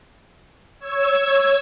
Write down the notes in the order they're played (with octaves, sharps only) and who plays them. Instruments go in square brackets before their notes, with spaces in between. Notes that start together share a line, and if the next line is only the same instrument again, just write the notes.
[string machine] C#5 E6 G#6